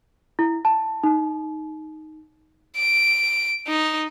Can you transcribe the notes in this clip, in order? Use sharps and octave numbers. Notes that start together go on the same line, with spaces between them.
E4
A5
D#4
D7
D#4